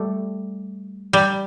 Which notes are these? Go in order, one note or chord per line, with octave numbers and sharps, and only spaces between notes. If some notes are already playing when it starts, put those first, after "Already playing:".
Already playing: G3 A3
G3